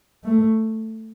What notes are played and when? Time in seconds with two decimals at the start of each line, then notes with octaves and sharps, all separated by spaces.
0.24 A3